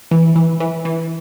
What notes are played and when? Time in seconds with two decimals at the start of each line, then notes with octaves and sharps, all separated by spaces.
0.11 E3
0.35 E3
0.60 E3
0.85 E3